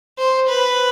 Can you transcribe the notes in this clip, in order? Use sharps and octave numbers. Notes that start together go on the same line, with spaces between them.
C5
B4